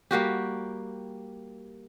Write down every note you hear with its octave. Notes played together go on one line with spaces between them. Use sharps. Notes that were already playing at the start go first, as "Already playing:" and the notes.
G3 A#3 F#4 G4